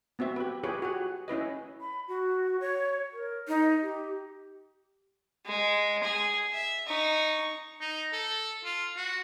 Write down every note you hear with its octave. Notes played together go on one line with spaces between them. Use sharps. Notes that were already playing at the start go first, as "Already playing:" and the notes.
B3 C4 F#4 E5
G4 B4
F4 G4 G#4 B4 C#5
F#4 G#4 F#5
C#4 E4 B4 D#5
B5
F#4
C#5
A#4
D#4
G4
G#3
G#4
E5
D#4 C#6
D#4
A4
F4
F#4